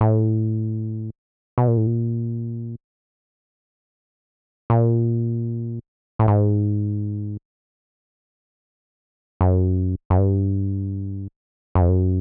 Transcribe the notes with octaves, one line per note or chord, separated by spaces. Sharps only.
A2
B2
A#2
A2
A#2
A#2
A2
G#2
F#2
F#2
G2
F#2
F2
F#2